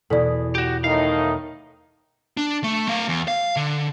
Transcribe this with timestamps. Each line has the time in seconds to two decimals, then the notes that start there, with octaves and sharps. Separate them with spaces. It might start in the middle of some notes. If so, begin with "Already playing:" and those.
0.10 E2 B2 A4 D5 B6
0.55 F#4 G4
0.84 A2 D#3 D#4 F5
2.37 D4
2.64 A3
2.88 A3 F5
3.08 E2
3.28 F5
3.56 D3